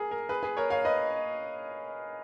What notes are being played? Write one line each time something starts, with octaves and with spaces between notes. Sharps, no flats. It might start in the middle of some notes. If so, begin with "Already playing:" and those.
Already playing: G#4 A#4
A#4
G#4 B4
G#4 B4
A#4 C#5
C#5 F5
B4 D#5